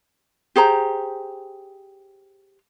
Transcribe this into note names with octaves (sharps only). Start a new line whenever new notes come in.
G4 G#4 C5 A#5